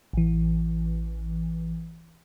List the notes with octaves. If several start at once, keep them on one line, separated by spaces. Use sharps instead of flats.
A1 E3